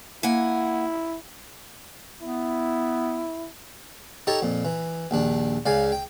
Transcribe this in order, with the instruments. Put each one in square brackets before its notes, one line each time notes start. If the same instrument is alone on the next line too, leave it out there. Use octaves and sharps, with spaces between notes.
[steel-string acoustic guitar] A#3 F#5 G#5 [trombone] E4
[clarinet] B3 [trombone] E4
[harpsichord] D#4 G4 A4 C#5 A5 A#5
F2 A#2
E3
A#1 D#2 D4
C#2 C#3 D5 F5 G#5
G5